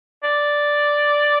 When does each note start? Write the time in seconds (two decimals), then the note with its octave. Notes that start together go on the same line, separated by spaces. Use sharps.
0.23 D5